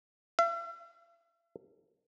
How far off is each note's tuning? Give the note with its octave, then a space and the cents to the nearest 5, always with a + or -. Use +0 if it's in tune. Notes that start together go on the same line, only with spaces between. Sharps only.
E5 +45